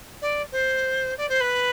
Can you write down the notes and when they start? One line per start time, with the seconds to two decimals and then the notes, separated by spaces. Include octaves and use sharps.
0.21 D5
0.52 C5
1.17 D5
1.29 C5
1.40 B4